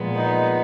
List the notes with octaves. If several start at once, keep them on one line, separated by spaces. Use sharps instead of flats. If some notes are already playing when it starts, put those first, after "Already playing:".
Already playing: A#2 F3 G#3 B3
D#4